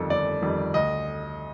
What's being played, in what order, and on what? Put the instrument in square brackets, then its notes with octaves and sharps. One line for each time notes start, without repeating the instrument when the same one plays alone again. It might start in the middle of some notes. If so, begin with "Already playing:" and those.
Already playing: [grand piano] G1 F2 D#3 G3 A4
G1 D5
F2 D#3 G3
D2 D#5